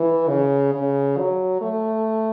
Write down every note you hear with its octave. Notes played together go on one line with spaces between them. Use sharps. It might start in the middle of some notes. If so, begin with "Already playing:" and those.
Already playing: E3
C#3
C#3
F#3
A3